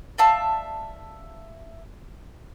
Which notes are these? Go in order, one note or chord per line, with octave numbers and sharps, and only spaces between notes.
D5 E5 F5 A5